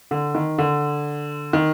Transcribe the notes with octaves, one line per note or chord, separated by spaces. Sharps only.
D3
D#3
D3
D#3